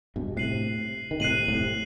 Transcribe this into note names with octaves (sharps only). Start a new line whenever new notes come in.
G2 B2
A2 C3 F#6 C7 D#7 F#7
D#3
A2 C3 F#6 C7 D#7 F#7
A2 C3